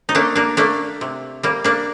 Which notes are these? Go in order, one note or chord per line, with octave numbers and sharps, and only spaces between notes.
D#4
A3 A#3 D4
A#3 D4
A3 A#3 D4
C3
G3 A#3
A#3 D4